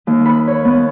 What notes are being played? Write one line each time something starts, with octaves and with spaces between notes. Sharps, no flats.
D#2
B5
C#5
B3